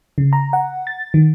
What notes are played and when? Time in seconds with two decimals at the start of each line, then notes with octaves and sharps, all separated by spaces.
0.18 C#3
0.33 A#5
0.53 F#5
0.87 A6
1.14 D#3